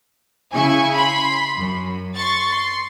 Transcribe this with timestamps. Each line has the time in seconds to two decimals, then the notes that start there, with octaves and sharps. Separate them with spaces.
0.52 C#3 E4 G#5 C#6
0.96 B5 C6
1.56 F#2
2.15 C6 C#6 A6
2.50 C6